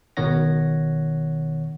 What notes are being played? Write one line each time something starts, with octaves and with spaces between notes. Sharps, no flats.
G#1 B2 D#3 C#5 F#5 A#6